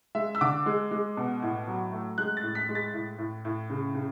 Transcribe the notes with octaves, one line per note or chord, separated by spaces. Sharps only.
G#3 E5
E6
D3 D6
G#3
G#3
B2
A2
F#3
A3
G#3 F#6
A6
A2
B6
G#3
A6
A2
A2
A2
C#3
C#3